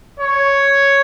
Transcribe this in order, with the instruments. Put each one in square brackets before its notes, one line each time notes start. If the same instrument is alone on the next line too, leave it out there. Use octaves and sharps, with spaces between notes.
[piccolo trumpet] C#5